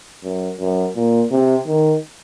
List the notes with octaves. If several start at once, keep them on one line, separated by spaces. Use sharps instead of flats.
F#2
F#2
A#2
C3
D#3